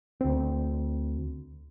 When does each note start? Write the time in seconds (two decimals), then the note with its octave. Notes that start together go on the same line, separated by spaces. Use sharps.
0.21 D2 C4